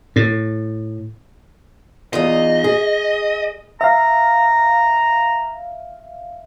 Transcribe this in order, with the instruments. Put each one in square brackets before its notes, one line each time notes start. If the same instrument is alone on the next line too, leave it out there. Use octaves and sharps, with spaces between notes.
[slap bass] A2
[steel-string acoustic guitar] E2 D#4 F4 [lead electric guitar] D#5
[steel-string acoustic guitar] G#4
[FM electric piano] E5 F5 [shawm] A#5